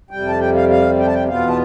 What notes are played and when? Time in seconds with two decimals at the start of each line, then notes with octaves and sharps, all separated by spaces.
0.10 F2 C3 G3 G5
0.28 A5
0.40 G5
0.55 F5
0.70 F5
0.99 G5
1.07 A5
1.13 G5
1.28 E2 B2 B3 F4 F5
1.48 A5